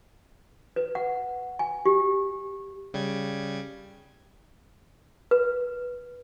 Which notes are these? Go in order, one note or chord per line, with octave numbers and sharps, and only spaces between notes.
B4
F#5
G#5
G4
C#3 G3 G#6
B4